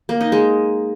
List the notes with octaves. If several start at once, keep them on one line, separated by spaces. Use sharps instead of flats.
A#3
D#4
G#3